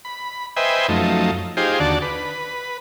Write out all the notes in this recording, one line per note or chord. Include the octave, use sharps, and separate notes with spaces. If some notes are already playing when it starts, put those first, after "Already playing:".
B5
B4 C5 D#5 E5 G5 G#5
F#2 F3 A3 D#4
D#4 F4 G4 G#4 C5
D#2 D3 F#4 D5 A5
B4